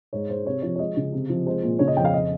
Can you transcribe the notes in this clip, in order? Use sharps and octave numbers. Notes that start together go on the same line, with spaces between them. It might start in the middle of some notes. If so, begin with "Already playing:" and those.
G#2 C#5
G#2 C5
C3 C#5
F3 C#5
C#5
G#3 D#5
C#3
C3
F3
G#3 C5
A#2
C#3 C#5
D#5
F2 G5
F5
D#5